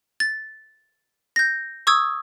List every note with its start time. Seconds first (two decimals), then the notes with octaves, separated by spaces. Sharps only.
0.20 A6
1.36 G6 A#6
1.87 C#6 D#6 E6 G#6